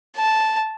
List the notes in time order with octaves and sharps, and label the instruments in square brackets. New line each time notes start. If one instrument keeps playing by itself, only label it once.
[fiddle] A5